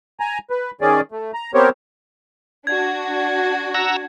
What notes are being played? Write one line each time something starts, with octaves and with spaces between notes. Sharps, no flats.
G#5 A#5
B4
D#3 C#4 G#4 D5
A3
A#5
B3 C4 G4 A#4 C5 C#5
D4 F#4 G#6
F#5 A#5 E6